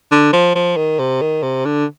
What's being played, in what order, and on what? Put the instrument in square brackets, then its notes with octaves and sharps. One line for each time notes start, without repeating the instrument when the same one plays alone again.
[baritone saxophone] D3
F3
F3
D#3
C3
D#3
C3
D3